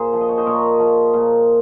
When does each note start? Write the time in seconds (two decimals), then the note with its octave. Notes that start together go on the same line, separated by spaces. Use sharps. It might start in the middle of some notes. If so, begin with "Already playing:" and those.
Already playing: A#2 G#4 C5
0.13 F3
0.21 D#5
0.29 C#5
0.37 C5 D#5
0.46 A#2 A#4 C#5
0.79 F3
1.14 A#2